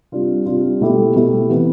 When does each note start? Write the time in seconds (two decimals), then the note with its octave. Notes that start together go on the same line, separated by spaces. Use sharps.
0.12 C3 G3 D4 F4
0.46 C3 G3 D4 F4
0.80 B2 A3 E4 G4
1.16 B2 A3 E4 G4
1.50 C3 E3 B3